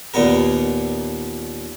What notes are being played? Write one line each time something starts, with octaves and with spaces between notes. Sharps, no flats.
D#2 A#2 B3 A#4